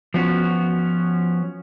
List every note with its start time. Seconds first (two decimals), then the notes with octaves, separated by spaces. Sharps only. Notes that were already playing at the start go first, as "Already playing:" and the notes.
0.14 F3 B3 C#4 F#4